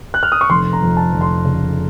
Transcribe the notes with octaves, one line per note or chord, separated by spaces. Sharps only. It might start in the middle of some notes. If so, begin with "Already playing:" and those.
F#6
F6
D#6
C#6
F1 C6
A#5
F2
A5
F1
C6
C#3